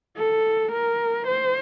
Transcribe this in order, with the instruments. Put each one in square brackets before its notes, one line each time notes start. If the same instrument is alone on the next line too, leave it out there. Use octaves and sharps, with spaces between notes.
[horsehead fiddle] A4
A#4
C5